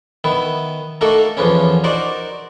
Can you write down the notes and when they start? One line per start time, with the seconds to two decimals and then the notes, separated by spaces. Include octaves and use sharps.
0.24 D#3 B3 E4
1.01 A3 A#3 D#4 F#4 A4 A#4
1.37 E2 F3 A#3 B3 C#4
1.84 D#4 F#4 A#4 C5 D5